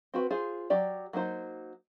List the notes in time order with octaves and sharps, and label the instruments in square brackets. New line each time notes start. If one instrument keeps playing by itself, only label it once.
[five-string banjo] C4 F#4 B4
F4 G#4 C5
F#3 G4 D5
F#3 A#3 D#4 C5